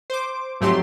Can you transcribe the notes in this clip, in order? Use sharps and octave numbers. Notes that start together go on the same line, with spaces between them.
C5 D6
F2 G#2 F#3 A3 G4 C6